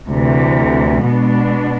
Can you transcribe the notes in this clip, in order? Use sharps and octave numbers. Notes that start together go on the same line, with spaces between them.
D2 C3 E3
B2 G#3 B3 D4